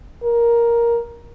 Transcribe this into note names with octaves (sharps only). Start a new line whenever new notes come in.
A#4